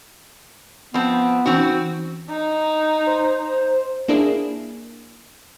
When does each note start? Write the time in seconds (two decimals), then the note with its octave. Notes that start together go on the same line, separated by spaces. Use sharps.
0.94 F3 B3 C4
1.46 E3 C4 C#4 D#4 F#4
2.30 D#4
3.07 C5
4.08 A#3 D4 E4 G#4